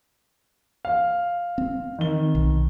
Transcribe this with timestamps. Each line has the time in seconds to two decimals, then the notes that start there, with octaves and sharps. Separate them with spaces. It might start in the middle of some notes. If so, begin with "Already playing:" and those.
0.85 F5
1.58 C4
1.99 D#3 G7
2.35 B1